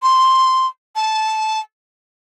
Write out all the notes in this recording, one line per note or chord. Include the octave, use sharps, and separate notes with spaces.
C6
A5